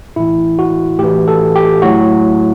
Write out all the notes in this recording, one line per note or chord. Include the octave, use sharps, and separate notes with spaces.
A2 E3 E4
F#4
A2 E3 G4
A4
G4
A2 F#3 F#4